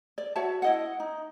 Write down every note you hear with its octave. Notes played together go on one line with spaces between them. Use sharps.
D5
F#4 C#5 E5 A5
E4 D#5 F#5
D#4